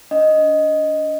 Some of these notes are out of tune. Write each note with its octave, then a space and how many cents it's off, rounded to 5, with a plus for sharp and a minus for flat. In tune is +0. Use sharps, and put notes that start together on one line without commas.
D4 -45 D#5 +0